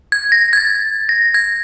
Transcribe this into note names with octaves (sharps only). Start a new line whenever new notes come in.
G#6
A#6
G#6
A6
A#6
G#6